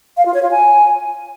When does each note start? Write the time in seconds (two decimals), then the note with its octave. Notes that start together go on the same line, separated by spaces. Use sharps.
0.17 F5
0.26 F4
0.34 C#5
0.43 F4
0.51 G#5